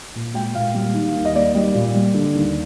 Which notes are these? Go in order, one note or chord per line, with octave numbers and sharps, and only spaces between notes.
A#2
G#3 G5
A#2 F5
G3
D#3
D#2
D#5
A#3 D5
G3
A#2
G3
D3
D#2